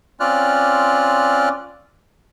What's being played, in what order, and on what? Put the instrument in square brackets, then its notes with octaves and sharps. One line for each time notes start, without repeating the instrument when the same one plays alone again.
[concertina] C4 C#4 F4 D5 F6 F#6